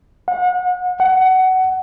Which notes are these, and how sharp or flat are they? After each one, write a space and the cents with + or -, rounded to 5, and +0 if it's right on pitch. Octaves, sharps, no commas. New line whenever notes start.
F#5 -35
F#5 +20